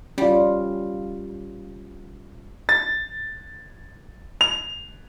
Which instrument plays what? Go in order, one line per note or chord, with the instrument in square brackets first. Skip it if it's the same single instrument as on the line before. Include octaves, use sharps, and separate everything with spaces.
[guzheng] G3 [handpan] C#4 F4
[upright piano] A6
F7